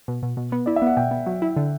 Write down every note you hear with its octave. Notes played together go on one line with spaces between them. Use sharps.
B2
B2
B2
B3
E4 D5
E5
B3 F#5
B2 G5
B3
F#3
E4
D3